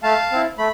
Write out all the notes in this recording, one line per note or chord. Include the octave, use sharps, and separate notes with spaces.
A3 F5 A5
C4 E4
A3 B5